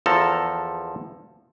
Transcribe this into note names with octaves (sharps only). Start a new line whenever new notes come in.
E2 F3 A4 A5 A#5